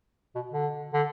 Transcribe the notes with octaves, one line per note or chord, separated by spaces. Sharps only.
B2
D3
D3